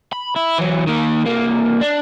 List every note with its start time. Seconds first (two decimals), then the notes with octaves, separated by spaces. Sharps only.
0.13 B5
0.36 E4
0.58 E3 F#3
0.87 D#3 A#3
1.24 C2 A#3
1.81 D4